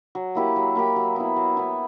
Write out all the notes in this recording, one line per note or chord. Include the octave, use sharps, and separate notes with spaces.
F#3
A#3 E4 G4
F#3
A#3 E4 G4
F#3
B3 E4
F#3
B3 E4